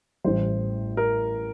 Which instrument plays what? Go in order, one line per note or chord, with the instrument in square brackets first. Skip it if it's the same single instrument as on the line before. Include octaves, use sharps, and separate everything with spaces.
[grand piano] A1 A2 G3 [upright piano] C5
[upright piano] A#4